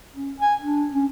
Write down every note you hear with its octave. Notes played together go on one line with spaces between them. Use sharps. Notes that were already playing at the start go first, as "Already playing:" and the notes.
C#4
G#5
D4
C#4